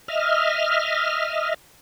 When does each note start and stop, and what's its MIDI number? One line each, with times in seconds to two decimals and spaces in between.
0.08 1.54 75
0.08 1.54 76
0.08 1.54 89